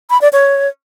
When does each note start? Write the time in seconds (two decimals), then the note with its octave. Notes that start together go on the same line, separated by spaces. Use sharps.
0.10 B5
0.21 D5
0.33 C#5